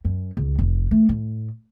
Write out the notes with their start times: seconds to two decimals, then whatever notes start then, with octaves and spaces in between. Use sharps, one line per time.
0.05 F#2
0.37 C#2
0.59 F1
0.91 A3
1.09 A2